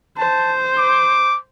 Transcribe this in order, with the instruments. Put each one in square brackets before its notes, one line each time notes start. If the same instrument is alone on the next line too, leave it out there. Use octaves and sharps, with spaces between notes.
[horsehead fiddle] C5 [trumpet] A5
[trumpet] D6